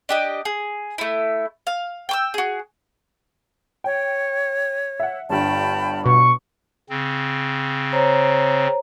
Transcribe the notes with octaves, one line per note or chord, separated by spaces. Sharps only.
D4 G4 D#5
G#4
A3 E4
F5
G5 D6 E6
F#4 G#4
C#5 G5
E5 F#5
G1 G2 G5 A5 B5
B2 C#6
C#3 C4
C5 C#5 A#5